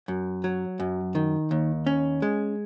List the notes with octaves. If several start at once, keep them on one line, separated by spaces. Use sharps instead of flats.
F#2
F#3
F#2
D#3
D#2
C#4
G#3